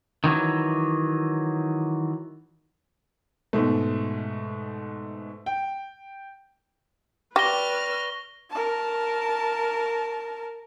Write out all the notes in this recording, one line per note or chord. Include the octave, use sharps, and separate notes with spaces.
D#3 E3 F#3
G#2 B2 A3
G5
G4 B4 D5 C#6 F6 A#6 G7
A#4 A5